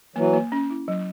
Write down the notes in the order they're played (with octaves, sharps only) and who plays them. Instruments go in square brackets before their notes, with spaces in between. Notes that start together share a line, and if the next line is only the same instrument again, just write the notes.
[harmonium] E3 F#3 [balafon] A#3
[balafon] A#3
C#4
E4
F#3